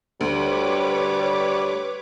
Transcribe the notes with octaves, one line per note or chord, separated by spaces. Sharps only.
D2 G3 B4 C#5 D6